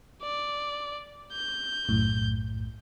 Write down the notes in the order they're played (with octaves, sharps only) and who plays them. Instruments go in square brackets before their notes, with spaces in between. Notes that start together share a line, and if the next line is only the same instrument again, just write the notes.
[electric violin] D5
G6
[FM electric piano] B1 F#2 A2